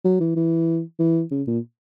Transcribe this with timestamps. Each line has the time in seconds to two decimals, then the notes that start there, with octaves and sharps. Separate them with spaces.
0.04 F#3
0.20 E3
0.36 E3
0.99 E3
1.31 C#3
1.47 A#2